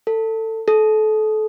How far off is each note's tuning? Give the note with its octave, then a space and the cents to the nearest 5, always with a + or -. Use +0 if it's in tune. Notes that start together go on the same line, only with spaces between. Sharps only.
A4 +20
A4 -30